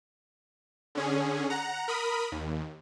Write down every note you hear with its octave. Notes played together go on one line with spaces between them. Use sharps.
D3 C#4 G#4
F#5 A#5
A#4 B5 D#6
D#2